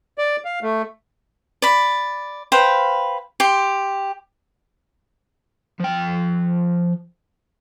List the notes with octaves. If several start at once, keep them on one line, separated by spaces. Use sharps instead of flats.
D5
F5
A3
D5 B5
B4 C5 F5 G5
G4 C6
F3 G5